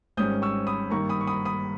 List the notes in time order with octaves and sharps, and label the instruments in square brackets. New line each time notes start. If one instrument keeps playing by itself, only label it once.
[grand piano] G#1 G#2 G3 C#4 D#6 G6
C#6 E6
B5 D#6
G2 D#3 A#3 D#4 A#5 C#6
B5 D#6
C#6
B5 D#6
B5 D#6